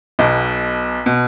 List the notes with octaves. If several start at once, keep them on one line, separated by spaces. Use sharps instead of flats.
B1 B2
B2